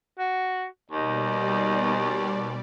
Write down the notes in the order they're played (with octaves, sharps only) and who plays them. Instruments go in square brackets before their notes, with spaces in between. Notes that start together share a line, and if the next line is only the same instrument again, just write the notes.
[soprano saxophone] F#4
[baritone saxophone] D#2 [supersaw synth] B2 G3 D5 [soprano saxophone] D#4